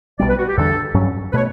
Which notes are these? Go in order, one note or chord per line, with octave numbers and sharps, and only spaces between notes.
B1 B2 G3 B3 D5
B4
F#4
G4
E2 D3 G3 D4 A4
G2 F#3 C#4
B2 A3 B4 C#5